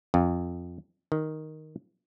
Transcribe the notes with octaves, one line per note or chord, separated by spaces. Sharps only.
F2
D#3